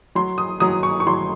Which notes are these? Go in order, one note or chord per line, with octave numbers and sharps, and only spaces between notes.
F#3 C6
D#6
F#3 D#6
C#6
C#6
F#3 C6